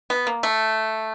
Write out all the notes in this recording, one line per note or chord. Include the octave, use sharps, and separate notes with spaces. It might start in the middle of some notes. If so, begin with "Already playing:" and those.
B3
A#3
A3